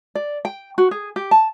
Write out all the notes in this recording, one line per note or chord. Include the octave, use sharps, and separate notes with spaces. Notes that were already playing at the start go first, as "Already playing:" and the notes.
D5
G5
F#4
G#4
G4
A5